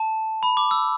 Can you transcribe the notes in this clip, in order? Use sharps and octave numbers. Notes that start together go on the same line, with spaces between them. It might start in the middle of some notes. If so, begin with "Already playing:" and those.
Already playing: A5
B5
D6
E6